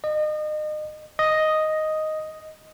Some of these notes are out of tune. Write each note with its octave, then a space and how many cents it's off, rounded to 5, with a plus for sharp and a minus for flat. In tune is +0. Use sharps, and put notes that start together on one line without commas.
D#5 -35
D#5 +0